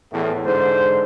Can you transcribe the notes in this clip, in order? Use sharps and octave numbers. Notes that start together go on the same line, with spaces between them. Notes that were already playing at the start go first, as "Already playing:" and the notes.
E2 A2
G#2 D3 C5